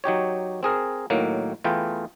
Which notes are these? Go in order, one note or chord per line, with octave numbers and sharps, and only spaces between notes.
F#3 D#4 G4 C#5
C4 G#4 A#4
A2 D#3 F#3 A#3
E2 E3 A3 F4 G5